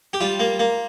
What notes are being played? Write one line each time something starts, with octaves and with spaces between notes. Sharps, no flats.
G4
G3 F4
A#3
A#3